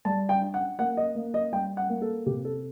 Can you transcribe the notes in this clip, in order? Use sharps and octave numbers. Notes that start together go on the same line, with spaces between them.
G3 A5
G5
D4
F#5
A#3 F#5
D#5
A#3
D#5
G3 G5
F#5
A#3
A4
C3 G4
A4